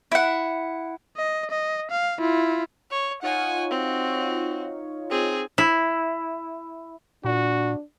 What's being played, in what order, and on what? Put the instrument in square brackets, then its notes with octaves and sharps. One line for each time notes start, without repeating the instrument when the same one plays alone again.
[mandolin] E4 F#5
[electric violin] D#5
D#5
F5
E4 F4
[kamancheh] C#5
[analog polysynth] D#4 F4 C#5 [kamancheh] F#5 G#5
[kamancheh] C4 F#4
C4 G#4
[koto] E4
[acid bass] A#2 [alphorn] D4 [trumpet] F#4